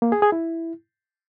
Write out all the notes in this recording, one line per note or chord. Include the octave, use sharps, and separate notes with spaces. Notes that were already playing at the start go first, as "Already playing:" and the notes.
A#3
G#4
G#4
E4